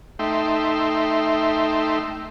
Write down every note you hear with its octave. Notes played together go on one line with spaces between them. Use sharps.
A3 D#4 E5 G5 C6